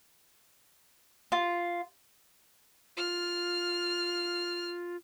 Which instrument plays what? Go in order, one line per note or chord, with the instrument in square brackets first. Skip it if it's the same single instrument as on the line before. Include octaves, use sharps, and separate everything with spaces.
[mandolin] F4
[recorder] F4 [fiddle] F6